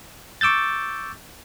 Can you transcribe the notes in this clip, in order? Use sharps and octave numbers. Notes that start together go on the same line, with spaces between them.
C#6 D6 E6 G6 A6